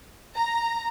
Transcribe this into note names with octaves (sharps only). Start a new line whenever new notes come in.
A#5